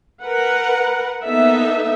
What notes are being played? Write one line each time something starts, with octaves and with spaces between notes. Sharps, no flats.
A#4 B4 F#5
A#3 B3 D#4 A4 E5